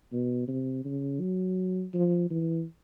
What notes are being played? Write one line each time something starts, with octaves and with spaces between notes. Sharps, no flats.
B2
C3
C#3
F#3
F3
E3